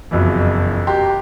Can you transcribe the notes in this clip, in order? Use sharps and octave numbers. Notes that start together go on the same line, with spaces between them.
F#1 F2 B2 E3
F#4 G4 A#5 C6